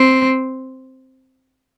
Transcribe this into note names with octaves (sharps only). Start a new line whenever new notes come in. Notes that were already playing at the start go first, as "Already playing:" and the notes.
Already playing: C4